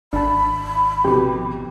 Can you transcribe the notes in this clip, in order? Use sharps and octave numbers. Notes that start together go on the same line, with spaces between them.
G#1 D4 A5 B5
F2 B2 G4